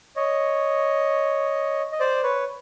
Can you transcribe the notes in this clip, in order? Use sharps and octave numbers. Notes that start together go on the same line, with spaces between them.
C#5 D#5
D#5
C5 D5
B4 C#5